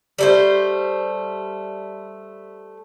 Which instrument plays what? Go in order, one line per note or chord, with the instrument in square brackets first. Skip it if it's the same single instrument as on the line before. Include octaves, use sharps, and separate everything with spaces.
[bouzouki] G3 A3 C5